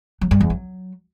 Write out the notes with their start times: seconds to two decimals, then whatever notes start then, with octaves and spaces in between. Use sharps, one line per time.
0.21 F#3
0.31 G2
0.40 E2
0.50 F#3